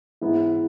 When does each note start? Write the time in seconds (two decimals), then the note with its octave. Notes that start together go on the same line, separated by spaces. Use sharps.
0.22 G#2 E3 B3 E4